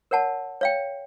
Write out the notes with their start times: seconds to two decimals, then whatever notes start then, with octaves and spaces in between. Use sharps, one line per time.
0.11 A#4 C#5 F#5 A5
0.61 C#5 F5 G5